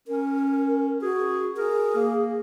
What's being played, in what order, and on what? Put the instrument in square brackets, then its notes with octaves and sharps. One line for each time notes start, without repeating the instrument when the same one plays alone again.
[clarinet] C#4 [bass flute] A#4
[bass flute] F#4 [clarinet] G#4
[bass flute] G#4 [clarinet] A#4
[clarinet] A#3